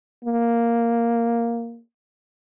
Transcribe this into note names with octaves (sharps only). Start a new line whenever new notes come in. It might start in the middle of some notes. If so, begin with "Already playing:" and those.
A#3